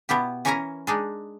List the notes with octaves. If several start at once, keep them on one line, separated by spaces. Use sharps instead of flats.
B2 B3 E4 G4
E3 C#4 E4 A#4 G#5 A#5
G#3 D4 D#4